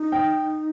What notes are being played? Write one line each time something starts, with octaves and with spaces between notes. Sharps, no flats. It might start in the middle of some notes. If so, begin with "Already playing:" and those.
Already playing: D#4
G5